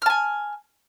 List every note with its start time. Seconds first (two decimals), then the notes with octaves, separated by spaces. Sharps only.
0.02 F6
0.06 A5
0.10 G#5